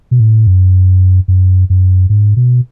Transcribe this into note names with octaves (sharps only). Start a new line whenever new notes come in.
B2
A2
F#2
F#2
F#2
G#2
B2